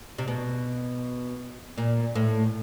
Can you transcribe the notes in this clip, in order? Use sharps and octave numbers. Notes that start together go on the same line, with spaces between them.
C3
B2
A#2
A2